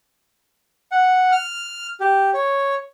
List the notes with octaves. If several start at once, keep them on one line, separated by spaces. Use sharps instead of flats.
F#5
F6
G4
C#5